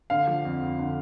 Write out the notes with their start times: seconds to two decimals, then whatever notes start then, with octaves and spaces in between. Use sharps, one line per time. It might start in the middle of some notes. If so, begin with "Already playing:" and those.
0.10 D3 F5
0.27 F3
0.45 F2
0.62 F2
0.79 D3